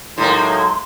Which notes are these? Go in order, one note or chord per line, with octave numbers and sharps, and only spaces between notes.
A2 F#3 G#3 A#3 D#4 C6